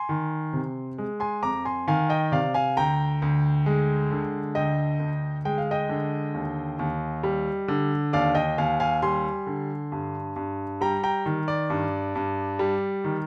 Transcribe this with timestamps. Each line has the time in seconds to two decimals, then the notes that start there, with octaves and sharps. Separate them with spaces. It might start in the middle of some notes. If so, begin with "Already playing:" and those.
Already playing: G#5 C6
0.09 D#3
0.53 C3
0.98 G#3
1.20 G#5 C6
1.43 F2 A#5 D6
1.65 G#5 C6
1.88 D#3 F5 G#5
2.10 D#5 G5
2.32 C3 D5 F5
2.54 F5 G#5
2.77 D2 G5 A#5
3.22 D2
3.66 G#3
4.11 D3
4.55 D2 D#5 G5
5.00 D2
5.45 G#3 G5
5.58 F5
5.71 D#5 G5
5.89 D3
6.34 D#2
6.79 D#2
7.23 G3
7.68 D3
8.13 D#2 D5 F5
8.35 D#5 G5
8.58 D#2 F5 G#5
8.80 F5 G#5
9.02 G3 G#5 C6
9.47 D3
9.92 G2
10.36 G2
10.81 G3 G5 A#5
11.03 G5 A#5
11.26 D#3
11.48 D5
11.70 G2
12.15 G2
12.59 G3
13.04 D#3